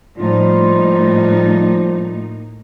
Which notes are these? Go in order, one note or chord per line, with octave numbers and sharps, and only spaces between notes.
A2 F3 G3 A#3 D#4 F4